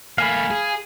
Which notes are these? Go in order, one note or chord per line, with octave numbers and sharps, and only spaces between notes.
A3 A#3 F5 G#5 B5
G#4